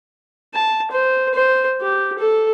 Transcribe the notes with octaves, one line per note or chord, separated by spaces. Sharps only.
A5
C5
C5
G4
A4